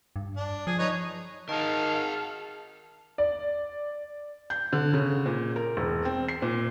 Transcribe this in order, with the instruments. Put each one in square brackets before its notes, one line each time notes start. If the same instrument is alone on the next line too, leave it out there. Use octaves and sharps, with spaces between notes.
[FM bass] G2
[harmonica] D4
[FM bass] F3 [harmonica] G#4
[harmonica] D#4 B4 C#5
[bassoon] D#3 [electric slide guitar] G#4 A#4 [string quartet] F5 F#5 F6 [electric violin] A5
[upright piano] D5
[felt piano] G6
D3
C#3
A#2
A#4
E1
C4
C7
A#2